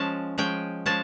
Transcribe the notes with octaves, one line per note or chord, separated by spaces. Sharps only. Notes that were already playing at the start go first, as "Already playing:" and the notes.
Already playing: F3 G#3 C#4 A5
F3 G#3 C#4 G5
F3 G#3 C#4 A5